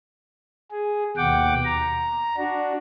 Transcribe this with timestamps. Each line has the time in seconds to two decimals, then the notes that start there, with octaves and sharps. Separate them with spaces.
0.71 G#4
1.17 D#2 B2 F#5 G5 D6
1.65 A#5
2.37 D4 F#4